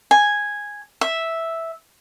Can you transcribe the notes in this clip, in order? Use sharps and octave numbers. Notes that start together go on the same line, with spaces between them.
G#5
E5